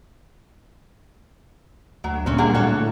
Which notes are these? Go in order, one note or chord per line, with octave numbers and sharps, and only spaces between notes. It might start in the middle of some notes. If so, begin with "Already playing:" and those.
D2 F#3
A#2 D3 C4 C#4
G3 A#3 G#4 F#5
A2 F#4 A4 C#5